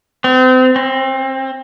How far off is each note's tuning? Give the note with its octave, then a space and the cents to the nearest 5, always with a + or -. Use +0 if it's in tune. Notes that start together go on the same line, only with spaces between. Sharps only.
C4 -35
C4 +25